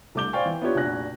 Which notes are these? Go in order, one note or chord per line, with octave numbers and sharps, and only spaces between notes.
C2 A3 D4 D6 G6 G7
C5 D5 F5 G5 G#5 C#6
E3
B3 D4 E4 F4 G4 C#5
F1 A#1 F#4 G#5 F#6 A#6